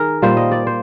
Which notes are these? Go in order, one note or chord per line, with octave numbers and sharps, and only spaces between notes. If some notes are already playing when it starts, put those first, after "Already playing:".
Already playing: D#3 G#4 A#4
A#2 G3 A#3 C5
D#5
D5
C5